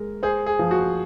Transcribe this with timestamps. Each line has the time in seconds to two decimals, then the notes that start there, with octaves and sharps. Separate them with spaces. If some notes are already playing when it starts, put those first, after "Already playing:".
Already playing: G#3 A#4
0.23 G#4 C5
0.46 G#4
0.59 F3
0.71 F#4